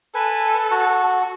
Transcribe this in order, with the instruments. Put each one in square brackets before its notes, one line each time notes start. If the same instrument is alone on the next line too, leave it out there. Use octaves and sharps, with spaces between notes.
[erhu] A4 [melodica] B4 G#5
[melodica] F#4 F#5